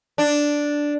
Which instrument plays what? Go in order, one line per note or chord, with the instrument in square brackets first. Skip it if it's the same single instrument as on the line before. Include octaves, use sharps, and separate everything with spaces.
[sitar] D4